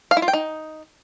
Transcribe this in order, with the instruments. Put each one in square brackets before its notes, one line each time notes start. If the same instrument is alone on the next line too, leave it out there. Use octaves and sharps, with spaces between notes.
[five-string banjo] F5
E4
F4
G5
D#4